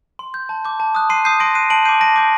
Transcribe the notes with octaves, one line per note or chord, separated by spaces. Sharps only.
C6
G6
A5
D6 G6
A5
D#6 F#6
C6 C7 D#7
D#6 G6 C7 D#7
C6 A#6 D7
F#6 C7 D#7
A5 D7 F#7
D6 G6 C7 D#7
A5 A#6 D7
D6 G6